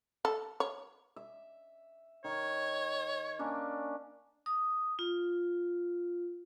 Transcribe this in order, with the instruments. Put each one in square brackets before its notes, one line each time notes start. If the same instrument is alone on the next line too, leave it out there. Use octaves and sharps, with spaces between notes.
[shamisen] A4
C#5
[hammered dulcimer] E5
[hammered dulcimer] D#3 [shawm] C#5
[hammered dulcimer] A#3 C#4 D4
[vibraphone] D#6
F4